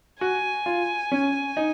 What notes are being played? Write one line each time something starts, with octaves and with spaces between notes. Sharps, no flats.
F#4 G#5
F4
C#4
D#4